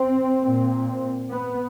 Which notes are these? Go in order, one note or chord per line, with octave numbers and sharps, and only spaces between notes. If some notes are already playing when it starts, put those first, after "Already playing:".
Already playing: C4
A#2
B3